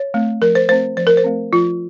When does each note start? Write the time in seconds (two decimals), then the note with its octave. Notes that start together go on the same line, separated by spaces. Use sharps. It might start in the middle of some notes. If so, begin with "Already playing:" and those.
Already playing: C#5
0.14 A3 C4
0.42 F3 A#4
0.55 C5
0.69 A3 C4 C5
0.97 F3 C5
1.07 A#4
1.17 C5
1.24 A3 C4
1.53 F3 F4